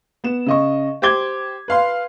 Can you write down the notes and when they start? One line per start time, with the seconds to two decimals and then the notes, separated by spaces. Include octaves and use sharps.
0.24 B3 E7
0.46 C#3 D#5 C#6
1.02 G4 C5 D6 G#6 G7
1.68 B4 F5 C6